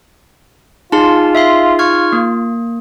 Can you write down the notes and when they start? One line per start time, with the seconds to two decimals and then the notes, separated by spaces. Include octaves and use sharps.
0.92 D#4 F4 G#4 A5 C6
1.35 E5 F5 C6
1.79 C#6 F6 G#6
2.13 A#3